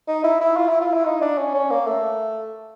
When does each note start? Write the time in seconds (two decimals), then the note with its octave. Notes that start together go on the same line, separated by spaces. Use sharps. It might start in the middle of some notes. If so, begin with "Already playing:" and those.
0.08 D#4
0.24 E4
0.41 E4
0.57 F4
0.69 E4
0.81 F4
0.93 E4
1.05 D#4
1.21 D4
1.38 C#4
1.54 C#4
1.70 A#3
1.87 A3